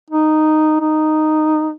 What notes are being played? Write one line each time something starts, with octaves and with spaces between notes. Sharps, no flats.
D#4
D#4